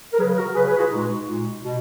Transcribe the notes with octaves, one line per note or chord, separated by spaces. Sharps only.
A#4
C#3 F#3 G#4 B4
F#4 A#4
C#3 F#3 G#4 B4
G#4 B4
F#4
F4 G#4
A#2 G#3 D#4 F#4
D#4 F#4
A#2 G#3
B2